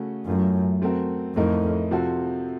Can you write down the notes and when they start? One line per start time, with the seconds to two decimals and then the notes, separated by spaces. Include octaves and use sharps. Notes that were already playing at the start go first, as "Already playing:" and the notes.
Already playing: C#3 A3 C#4 F#4
0.26 F#2 A2 A3 C#4 F4
0.82 A3 C4 F#4 A#4
1.35 F2 A2 A3 D#4 A#4
1.91 C3 F3 C4 F#4 A4